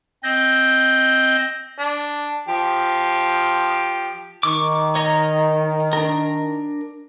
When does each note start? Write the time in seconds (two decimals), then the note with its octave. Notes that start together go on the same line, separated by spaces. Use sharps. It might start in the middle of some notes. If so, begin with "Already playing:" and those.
0.23 C4 D#5 G6
1.79 D4
2.48 F3 G4
4.43 D#3 C#6 D6
4.95 C#5 D#5 A#5
5.93 D4 A#4